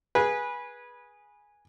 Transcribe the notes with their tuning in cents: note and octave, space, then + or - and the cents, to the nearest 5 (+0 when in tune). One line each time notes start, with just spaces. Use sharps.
G#4 -5 B4 -20